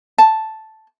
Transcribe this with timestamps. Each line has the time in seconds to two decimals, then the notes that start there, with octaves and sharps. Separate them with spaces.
0.18 A5